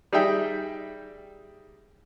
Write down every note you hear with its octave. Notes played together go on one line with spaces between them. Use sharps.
G3 D#4 G#4 E5 G5